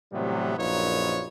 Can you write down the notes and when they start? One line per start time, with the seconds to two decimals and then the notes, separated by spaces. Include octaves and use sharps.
0.13 A2 C3 E3 F#3 G3 B3
0.58 A#1 F#2 D#4 F4 B4 C#5